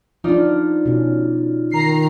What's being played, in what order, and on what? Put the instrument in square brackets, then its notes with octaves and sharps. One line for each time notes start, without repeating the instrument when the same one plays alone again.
[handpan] F3 D4 [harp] D#4 F4 D5
[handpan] B2 C#4
[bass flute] D#3 [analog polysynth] A#5 C7